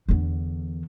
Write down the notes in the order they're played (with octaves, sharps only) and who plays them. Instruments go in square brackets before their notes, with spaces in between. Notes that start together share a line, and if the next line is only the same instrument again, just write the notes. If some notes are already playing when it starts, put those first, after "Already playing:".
[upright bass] E2 D3